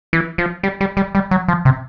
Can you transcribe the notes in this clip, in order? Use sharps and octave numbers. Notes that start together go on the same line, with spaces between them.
E3
F3
G3
G3
G3
G3
F#3
F3
C3